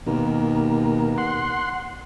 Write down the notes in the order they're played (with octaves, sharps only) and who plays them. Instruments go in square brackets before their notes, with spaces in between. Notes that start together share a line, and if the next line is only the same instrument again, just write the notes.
[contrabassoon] D#2 [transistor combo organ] B2 A#3
[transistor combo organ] F#5 C6